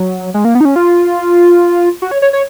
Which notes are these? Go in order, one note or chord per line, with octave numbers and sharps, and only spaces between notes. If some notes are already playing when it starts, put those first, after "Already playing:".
Already playing: F#3
G#3
A#3
B3
D#4
C#4
F4
F#4
C#5
C#5
C#5